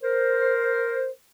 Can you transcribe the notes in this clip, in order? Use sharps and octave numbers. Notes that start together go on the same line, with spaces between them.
A#4 C5